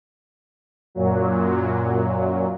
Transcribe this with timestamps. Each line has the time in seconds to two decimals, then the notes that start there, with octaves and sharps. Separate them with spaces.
0.95 F#2 A#2 F#3